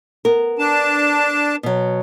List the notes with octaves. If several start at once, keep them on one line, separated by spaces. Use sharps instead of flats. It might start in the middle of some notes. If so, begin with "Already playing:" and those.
B3 A#4
D4 A5
B2 F#3